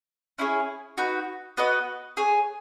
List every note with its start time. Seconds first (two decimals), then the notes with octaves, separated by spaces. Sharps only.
0.38 C#4 E4 G#4 C#5
0.98 D#4 F#4 B4
1.57 B3 F#4 B4 D#5
2.17 G#4 C#5 G#5